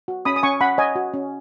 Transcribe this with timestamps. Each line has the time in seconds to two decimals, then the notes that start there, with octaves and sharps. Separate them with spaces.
0.08 F#4
0.25 C#4 B5 D#6
0.36 D#6
0.43 C#4 G#5 C#6
0.61 C#4 F#5 B5
0.78 C#5 D#5 G#5
0.95 F#4
1.14 C#4